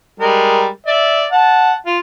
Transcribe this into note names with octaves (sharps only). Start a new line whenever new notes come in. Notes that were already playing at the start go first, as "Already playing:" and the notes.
G3 G#3 A#4
D5 E5
F#5 A5
F4